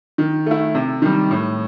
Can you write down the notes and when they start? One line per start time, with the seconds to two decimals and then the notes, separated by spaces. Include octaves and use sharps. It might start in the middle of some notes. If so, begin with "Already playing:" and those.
0.18 D#3
0.46 A3 E4
0.75 C3
1.02 D#3 G3
1.31 A2